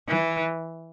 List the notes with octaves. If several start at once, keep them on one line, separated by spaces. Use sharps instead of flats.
E3